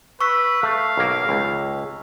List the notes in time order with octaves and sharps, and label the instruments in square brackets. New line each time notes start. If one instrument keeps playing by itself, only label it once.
[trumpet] B4 [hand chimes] C#6 E6 B6
[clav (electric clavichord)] A3 [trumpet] F5
[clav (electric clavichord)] B1 A#3
C#2